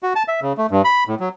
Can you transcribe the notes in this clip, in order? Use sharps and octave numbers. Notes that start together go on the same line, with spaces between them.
F#4
A5
E5
C#3
A3
G2
B5
A2
F#3